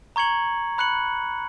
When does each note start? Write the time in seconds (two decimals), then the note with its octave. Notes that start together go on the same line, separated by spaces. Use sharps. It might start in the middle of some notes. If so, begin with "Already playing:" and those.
0.16 A#5 C#6 G#6 C#7 F#7
0.78 B5 F#6 C#7 F#7